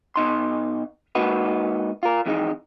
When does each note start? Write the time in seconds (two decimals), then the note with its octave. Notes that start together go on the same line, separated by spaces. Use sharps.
0.16 B2 D#4 C6
1.15 G#2 A#3 D#4 F#4 B4
2.03 F4 A#4
2.26 F2 G#2 E3 G#3 C#4 D#4